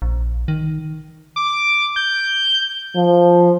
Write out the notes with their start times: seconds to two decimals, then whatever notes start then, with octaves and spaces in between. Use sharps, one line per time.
0.02 A#1
0.48 D#3
1.36 D6
1.96 G6
2.96 F3